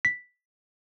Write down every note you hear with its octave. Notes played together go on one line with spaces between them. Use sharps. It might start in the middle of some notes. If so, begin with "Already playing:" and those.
B6